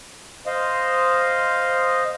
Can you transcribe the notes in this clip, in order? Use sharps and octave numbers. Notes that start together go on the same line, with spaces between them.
C5 D#5 F5